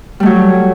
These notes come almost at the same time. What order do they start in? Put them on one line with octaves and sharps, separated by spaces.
G3 A3 F#3